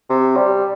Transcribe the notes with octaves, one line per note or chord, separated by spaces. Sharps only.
C3
G3